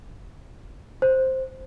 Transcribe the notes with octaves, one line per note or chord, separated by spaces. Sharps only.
C5